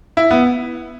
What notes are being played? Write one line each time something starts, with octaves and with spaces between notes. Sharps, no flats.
E4
B3